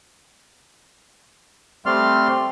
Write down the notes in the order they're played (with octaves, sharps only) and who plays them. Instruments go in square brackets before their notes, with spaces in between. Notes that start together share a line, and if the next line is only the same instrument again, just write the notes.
[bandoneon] G3 A3 C4 D5 C6 F6